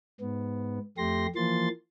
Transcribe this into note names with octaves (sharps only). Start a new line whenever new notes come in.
G#2 B3
F2 A3 G4 C6 A#6
E3 F3 A#3 C6 A6